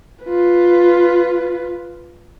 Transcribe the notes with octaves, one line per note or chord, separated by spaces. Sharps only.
F4 B4